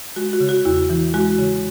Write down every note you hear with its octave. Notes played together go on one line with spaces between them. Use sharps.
G#3 F#4
F#4
C#3
F#4
E2 E4
E3
G#3 F#4
C#3